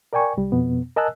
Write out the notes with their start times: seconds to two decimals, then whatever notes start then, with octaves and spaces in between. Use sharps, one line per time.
0.13 A#4 D5 G5 G#5 C#6
0.37 C2 G3
0.52 F2 B2 B3
0.97 A#4 D#5 G#5 A5 E6 F#6